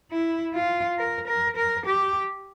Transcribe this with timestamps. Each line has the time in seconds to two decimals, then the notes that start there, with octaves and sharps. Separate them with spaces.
0.11 E4
0.54 F4
0.98 A#4
1.27 A#4
1.57 A#4
1.86 G4